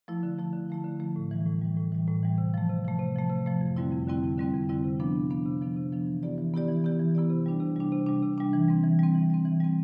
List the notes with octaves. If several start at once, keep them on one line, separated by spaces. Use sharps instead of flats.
F3 A3 E4
D3
F3 A3 E4
D3
F3 A3 E4
D3
F3 A3 E4
A2
E3 G3
A2
E3 G3
A2
E3 G3
A2
E3 G3
C3
F3 A3
C3
F3 A3
C3
F3 A3
C3
F3 A3
F2
D3 G3 C4 E4
F2
D3 G3 C4 E4
F2
D3 G3 C4 E4
F2
D3 G3 C4 E4
C3
F3 B3 D4
C3
F3 B3 D4
C3
F3 B3 D4
C3
F3 B3 D4
E3
B3 E4 G4 D5
E3
B3 E4 G4 D5
E3
B3 E4 G4 D5
E3
B3 E4 G4 D5
C3
G3 D4
C3
G3 D4
C3
G3 D4
C3
G3 D4
E3
G3 C4
E3
G3 C4
E3
G3 C4
E3
G3 C4